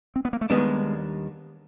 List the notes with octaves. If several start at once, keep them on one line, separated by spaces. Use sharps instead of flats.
C4
B3
A#3
A3
D#2 D#3 G3 G#3 B3 D4